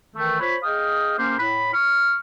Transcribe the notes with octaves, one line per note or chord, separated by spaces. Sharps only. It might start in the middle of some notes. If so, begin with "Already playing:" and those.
D#3 E3 A3
F4 C5 C#5 B5
G#4 D#5 F5 G5 D#6
A#3 C#4 G4 A#4 C5
A2 B5
C#6 F6